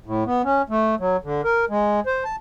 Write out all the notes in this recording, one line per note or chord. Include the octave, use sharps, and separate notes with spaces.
A2
B3
C#4
A3
F#3
D3
A#4
G#3
C5
A5